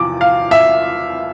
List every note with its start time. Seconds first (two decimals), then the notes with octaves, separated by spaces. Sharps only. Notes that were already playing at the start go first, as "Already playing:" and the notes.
Already playing: E2 C3 F3 D6
0.21 F5
0.51 E5